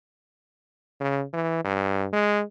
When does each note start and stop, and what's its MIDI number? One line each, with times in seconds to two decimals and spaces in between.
1.00 1.23 49
1.33 1.63 52
1.64 2.07 43
2.13 2.43 56